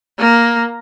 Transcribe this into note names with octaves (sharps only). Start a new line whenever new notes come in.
A#3